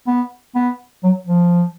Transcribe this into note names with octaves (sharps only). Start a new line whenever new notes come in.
B3
B3
F#3
F3